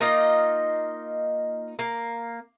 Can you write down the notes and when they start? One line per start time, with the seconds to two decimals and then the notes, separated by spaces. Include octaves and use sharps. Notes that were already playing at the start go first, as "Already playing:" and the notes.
0.01 A#3 D#4 F4 D#5
1.79 A#3